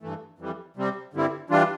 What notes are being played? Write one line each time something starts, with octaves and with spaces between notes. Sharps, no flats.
G2 E3 A3
F2 E3 G3
C3 G3 C4
G2 D3 G3 C4 E4
E3 G3 D4 F4